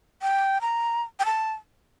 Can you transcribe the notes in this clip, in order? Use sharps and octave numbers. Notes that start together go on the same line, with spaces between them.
G5
A#5
G5
A5